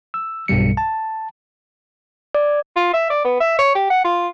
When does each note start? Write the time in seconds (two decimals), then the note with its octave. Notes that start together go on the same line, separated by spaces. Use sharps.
0.14 E6
0.48 B1 G2 B2 G3 C#7
0.77 A5
2.35 D5
2.76 F4
2.94 E5
3.10 D5
3.25 B3
3.40 E5
3.58 C#5
3.75 G4
3.90 F#5
4.04 F4